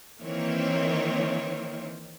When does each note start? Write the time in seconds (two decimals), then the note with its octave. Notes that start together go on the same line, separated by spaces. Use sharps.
0.19 D#3 E3 A#3 C4 C#5